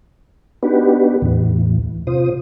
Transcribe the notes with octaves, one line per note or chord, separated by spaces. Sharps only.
B3 D4 D#4 F#4 G4 B4
E2 A2 E3
C3 F4 C5 D#6